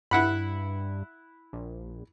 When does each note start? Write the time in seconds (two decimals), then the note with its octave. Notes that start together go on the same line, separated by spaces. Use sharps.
0.11 G2 E4 F#5 B5
1.53 A#1